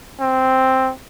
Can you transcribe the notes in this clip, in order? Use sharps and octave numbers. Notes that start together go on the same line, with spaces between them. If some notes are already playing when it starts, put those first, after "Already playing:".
C4